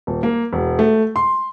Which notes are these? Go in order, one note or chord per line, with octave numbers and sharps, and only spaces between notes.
D#1
A#3
E1
A3
C6